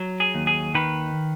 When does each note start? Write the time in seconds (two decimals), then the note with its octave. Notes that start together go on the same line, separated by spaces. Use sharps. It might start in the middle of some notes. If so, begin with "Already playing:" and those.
Already playing: F#3
0.20 G#4
0.35 D#2
0.47 G#4
0.75 D#3 B4